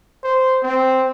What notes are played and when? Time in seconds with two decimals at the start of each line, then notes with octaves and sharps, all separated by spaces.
0.23 C5
0.63 C4